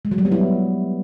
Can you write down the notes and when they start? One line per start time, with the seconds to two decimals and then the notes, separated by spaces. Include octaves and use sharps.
0.05 G#3
0.11 F#3
0.18 G3
0.25 B3
0.32 E4